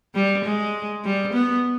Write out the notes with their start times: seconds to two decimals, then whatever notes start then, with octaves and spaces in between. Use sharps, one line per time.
0.15 G3
0.44 G#3
1.04 G3
1.33 B3